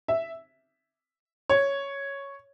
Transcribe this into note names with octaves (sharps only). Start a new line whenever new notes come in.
E5
C#5